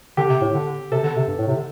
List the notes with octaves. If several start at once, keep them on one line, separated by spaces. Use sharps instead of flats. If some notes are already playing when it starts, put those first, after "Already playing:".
D3 G4
C3
A2
D3
C3 A4
D3
C3
G2
A2
C3
D3